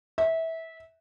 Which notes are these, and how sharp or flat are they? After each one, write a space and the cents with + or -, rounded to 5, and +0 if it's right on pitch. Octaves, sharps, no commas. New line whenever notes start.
E5 -20